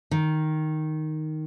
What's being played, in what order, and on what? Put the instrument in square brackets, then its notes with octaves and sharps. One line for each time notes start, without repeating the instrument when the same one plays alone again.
[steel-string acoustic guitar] D#3